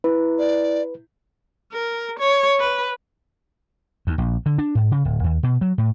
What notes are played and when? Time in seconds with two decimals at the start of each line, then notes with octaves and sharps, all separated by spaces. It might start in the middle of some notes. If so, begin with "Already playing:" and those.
0.04 E4 B4
0.39 D5
1.73 A#4
2.19 C#5
2.60 B4
4.07 D#2
4.18 A#1
4.46 D3
4.58 D4
4.75 G#2
4.91 C#3
5.05 D1
5.24 D#2
5.43 B2
5.61 F#3
5.78 A2